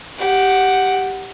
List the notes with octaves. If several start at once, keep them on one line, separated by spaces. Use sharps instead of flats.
G4 F#5